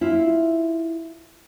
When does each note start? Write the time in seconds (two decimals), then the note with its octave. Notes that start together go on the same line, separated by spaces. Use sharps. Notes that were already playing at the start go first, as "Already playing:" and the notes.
0.01 E4 F4